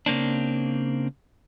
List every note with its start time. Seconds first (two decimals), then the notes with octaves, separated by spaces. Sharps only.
0.06 C#3 A#3 C4 D4